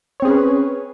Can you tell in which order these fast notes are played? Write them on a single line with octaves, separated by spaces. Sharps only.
C#5 C4 G#4 C#4 B4